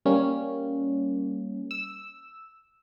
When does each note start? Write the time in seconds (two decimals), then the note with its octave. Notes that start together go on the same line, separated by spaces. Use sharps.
0.06 G3 A#3 C#4
1.71 E6